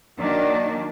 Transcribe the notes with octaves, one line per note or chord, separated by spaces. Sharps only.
D#3 F#3 A#3 D4 D5